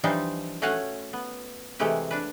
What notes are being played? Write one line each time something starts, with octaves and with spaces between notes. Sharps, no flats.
E3 F3 G3 D4 D#4 C5
A3 C#4 F#4 F5 F#5 G#5
B3
C3 E3 G#3 A3 G4 B4
D4 B4